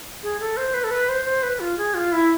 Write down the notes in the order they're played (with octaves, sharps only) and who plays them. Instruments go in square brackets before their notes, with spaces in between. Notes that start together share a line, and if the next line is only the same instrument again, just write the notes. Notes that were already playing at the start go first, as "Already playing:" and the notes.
[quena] G#4
A4
C5
B4
A4
B4
C5
C5
B4
F4
G#4
F4
E4